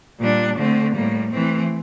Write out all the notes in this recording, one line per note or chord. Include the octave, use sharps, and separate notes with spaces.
A#2 G3 D4
D3 A3 C4
A2 G3 A#3
E3 A3 C4